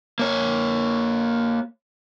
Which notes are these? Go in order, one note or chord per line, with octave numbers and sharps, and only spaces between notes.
A#3 C#5